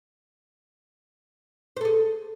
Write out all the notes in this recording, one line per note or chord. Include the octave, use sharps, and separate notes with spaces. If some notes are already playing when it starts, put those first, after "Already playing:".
G#4 A4 C5